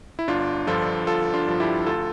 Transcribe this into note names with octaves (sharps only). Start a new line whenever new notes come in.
E4
G1 D4 F4
G2 F3 F4 A4
G1 F4 A4
D4 F4
G2 F3
E4 G4
D2 F4 A4